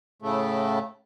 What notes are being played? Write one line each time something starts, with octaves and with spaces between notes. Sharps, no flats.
A2 C#3 A3